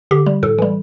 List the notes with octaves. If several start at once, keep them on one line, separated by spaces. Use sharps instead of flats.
D3 G4
G3
A2 A4
E3 G3